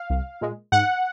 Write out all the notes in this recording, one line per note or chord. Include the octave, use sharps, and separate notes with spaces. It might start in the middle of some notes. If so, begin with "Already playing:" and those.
Already playing: F5
C2
A#2 G#3
G#2 F#5